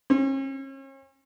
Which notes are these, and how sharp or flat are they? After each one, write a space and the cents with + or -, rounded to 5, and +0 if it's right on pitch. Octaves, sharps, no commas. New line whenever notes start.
C#4 -40